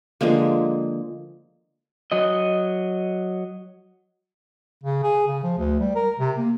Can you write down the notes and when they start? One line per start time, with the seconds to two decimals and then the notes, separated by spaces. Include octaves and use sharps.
0.21 D3 F3 G#3 A#3
2.12 F#3 D#5
4.84 C#3
5.03 G#4
5.28 C#3
5.43 F3
5.58 D2
5.80 G3
5.95 A#4
6.20 C3
6.38 A#3